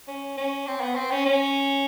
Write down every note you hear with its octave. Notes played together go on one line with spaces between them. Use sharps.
C#4
C#4
C4
B3
C4
C#4
C#4